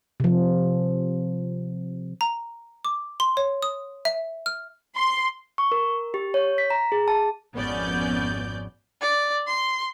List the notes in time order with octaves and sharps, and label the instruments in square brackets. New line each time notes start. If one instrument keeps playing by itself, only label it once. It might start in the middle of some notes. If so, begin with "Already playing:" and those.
[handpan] C3 F3
[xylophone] A#5
D6
C6
C#5
D#6
E5
F6
[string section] C6
[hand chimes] C#6
A#4
G4
C#5
B6
A#5
G#4
A5
[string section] G#1 F2 B3 C#4 D5 G6
[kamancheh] D5
C6